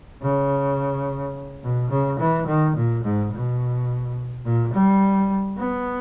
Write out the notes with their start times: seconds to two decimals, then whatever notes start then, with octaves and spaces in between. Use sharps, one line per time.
0.22 C#3
1.63 B2
1.90 C#3
2.20 E3
2.47 D#3
2.76 A#2
3.04 G#2
3.33 B2
4.45 A#2
4.74 G3
5.58 B3